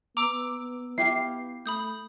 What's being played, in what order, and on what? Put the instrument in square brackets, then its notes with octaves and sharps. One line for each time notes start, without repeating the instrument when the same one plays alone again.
[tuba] B3 [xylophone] A#5 E6 [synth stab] D6
[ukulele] E4 G4 F5 [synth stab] C7
[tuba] A3 [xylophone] B5 D#6 G6